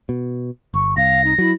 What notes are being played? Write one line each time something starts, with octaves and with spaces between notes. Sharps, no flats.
B2
G1 C#6
C2 F5 A#6
D#4
F#3 E4